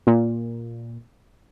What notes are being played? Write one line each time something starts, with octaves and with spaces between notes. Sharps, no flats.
A#2